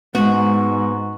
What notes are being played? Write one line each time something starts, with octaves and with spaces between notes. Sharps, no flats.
G#2 G#3 B3 F#4